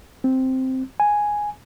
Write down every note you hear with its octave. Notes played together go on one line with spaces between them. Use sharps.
C4
G#5